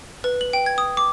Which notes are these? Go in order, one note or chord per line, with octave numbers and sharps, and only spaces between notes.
B4
F#7
G5
G#6
D#6
D6